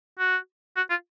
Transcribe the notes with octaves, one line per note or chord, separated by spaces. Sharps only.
F#4
F#4
F4